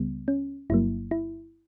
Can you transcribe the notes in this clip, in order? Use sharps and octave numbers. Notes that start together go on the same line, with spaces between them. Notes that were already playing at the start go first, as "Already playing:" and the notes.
Already playing: C#2 C#3 G3 B3
C#4
G1 G2 F#3 A#3 E4
E4